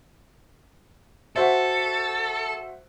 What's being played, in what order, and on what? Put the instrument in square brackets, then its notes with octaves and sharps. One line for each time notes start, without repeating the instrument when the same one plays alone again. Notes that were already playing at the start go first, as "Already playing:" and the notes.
[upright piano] F#4 C5 E5 [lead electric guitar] A4